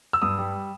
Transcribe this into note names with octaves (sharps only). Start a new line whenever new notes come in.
E6
G2 D#6
G3